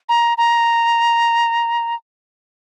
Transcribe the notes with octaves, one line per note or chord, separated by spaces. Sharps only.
A#5
A#5